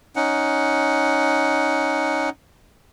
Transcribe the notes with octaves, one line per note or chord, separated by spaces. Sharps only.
C#4 D#4 F#5